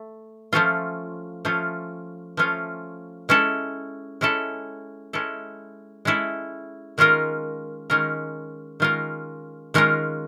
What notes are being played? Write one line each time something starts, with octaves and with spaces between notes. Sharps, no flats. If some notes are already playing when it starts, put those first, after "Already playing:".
Already playing: A3
F3 A3 C#4 F4
F3 A3 C#4 F4
F3 A3 C#4 F4
G#3 C#4 E4 A4
G#3 C#4 E4 A4
G#3 C#4 E4 A4
G#3 C#4 E4 A4
D#3 G#3 C#4 F4 A#4
D#3 G#3 C#4 F4 A#4
D#3 G#3 C#4 F4 A#4
D#3 G#3 C#4 F4 A#4